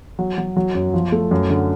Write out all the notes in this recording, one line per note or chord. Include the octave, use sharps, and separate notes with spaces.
F#3
F#3
F#3
F#2
F3
A3
F#2
D3